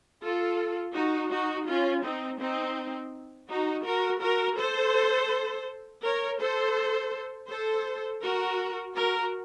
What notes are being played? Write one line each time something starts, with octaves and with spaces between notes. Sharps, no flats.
F4 A4
D#4 F#4
D#4 F#4
C#4 F4
C4 D#4
C4 D#4
D#4 F#4
F#4 A#4
F#4 A#4
A4 C5
A#4 C#5
A4 C5
A4 C5
F#4 A#4
F#4 A#4